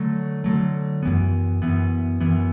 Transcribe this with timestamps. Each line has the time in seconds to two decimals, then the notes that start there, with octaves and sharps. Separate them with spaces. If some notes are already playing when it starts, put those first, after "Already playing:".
Already playing: D3 F#3 A3
0.44 D3 F#3 A3
1.03 F#2 E3 B3
1.62 F#2 E3 B3
2.21 F#2 E3 B3